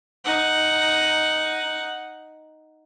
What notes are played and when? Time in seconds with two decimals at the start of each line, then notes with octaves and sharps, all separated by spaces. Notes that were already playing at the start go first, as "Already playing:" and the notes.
0.24 D#4 F#5